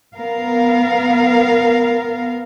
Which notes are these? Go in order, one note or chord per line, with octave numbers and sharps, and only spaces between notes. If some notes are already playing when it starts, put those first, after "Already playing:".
B3 A#4 F5